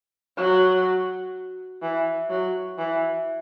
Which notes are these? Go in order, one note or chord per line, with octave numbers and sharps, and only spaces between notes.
F#3
E3
F#3
E3